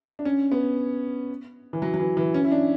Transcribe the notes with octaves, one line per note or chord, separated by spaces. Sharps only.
D4
C#4
B3
E3
F#3
F#3
E3
E3
C#4
E4
D4